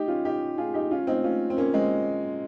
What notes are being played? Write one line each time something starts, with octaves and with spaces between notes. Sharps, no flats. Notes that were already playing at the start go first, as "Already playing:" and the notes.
Already playing: D#4 G4
C#4 F4
D#4 G4
F4 G#4
D#4 G4
C#4 F4
C4 D#4
C#4 F4
C4
A#3 C#4
G#3 C4